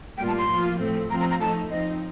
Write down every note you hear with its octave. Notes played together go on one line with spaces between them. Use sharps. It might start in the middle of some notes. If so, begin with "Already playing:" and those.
A2 G3 A#3 F4 G5
A5
C6
F3 A#3 F4
A2 F3 A3 C4
F3 C4 F4 A#5
A#5
A#5
F3 A3 D#4 A5
F3 C4 D#4 D#5